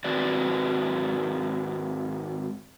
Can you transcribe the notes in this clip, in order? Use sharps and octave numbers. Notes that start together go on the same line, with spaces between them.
G#2 D#3 C4 F#4 B4 D5